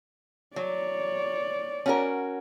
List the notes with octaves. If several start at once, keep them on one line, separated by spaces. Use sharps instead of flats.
F#3 C#5 D5
C#4 F#4 A#4